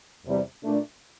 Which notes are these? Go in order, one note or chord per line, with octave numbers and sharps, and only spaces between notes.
E2 C3 G3
A#2 A3 D4